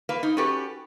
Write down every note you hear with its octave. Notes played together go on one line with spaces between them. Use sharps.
A#3 B4 F5
D#4
C#4 F#4 G4 A4 B4